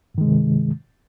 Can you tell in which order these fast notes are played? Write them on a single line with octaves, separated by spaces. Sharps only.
G2 D#3 G#3 C3